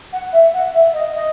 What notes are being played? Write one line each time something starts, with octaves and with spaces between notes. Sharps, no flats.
F#5
E5
F#5
E5
D#5
D#5